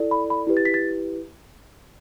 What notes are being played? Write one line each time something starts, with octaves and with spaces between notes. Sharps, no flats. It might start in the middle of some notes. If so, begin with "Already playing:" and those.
Already playing: E4 A4 D5
B5
B5
E4 G4 B4
A6
B6
A6